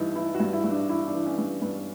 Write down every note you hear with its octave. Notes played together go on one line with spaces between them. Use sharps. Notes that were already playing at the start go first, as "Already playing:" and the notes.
Already playing: G2 E3 D#4 E4
E3 E4
F#4
G2
E4
G2
D4
E3 E4
D4
E3
C#4
G2
G2 B3